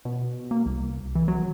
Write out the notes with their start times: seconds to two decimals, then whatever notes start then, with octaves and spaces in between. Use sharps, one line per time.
0.05 B2
0.51 A#3
0.66 C2
1.15 E3
1.28 F#3